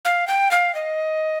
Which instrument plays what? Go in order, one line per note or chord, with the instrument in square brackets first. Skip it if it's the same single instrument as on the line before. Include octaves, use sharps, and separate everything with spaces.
[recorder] F5
G5
F5
D#5